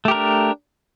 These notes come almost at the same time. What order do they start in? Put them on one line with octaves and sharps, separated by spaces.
A3 G4 A#4 D4